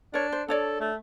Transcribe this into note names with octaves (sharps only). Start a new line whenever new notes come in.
D4 A#4 C#5
C5
D4 A4 C#5 D5
A3